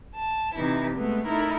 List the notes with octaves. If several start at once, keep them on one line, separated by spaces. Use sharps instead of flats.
A5
C3 E3 D#4 E4
G#3 A3 B3
A3 D#4 E4 A#4